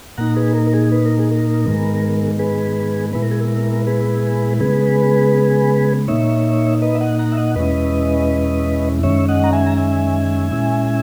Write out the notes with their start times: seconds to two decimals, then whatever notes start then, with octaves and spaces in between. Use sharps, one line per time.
0.17 A#2 A#3 D#4 F#5 A#5
0.36 G#4 B4
0.55 A#4
0.67 A#4
0.74 G#4
0.92 B4
1.05 A#4
1.19 G#4
1.31 A#4
1.65 G#2 D#3 G#3 B3
2.39 G#4 B4
3.13 A#2 G#3 B3 E4 B4
3.22 A#4
3.31 G#4
3.41 A#4
3.87 G#4 B4
4.60 C#3 G#3 B3 G#4 B4
6.08 A#2 A#3 D#4 C#5 E5
6.82 B4 D#5
6.95 E5
7.01 D#5 F#5
7.19 F#5 A#5
7.32 E5
7.37 D#5 F#5
7.56 E2 B2 G#3 C#4 E4 B4 D#5
9.03 F#2 D#3 G#3 C#4 C#5 E5
9.29 D#5 F#5
9.44 A#5
9.53 E5 G#5
9.67 A#5
9.77 E5 G#5
10.51 A#2 G#3 C#4 E4